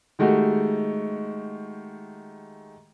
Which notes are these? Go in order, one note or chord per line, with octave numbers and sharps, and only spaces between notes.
D#3 G#3 A3 F#4 G4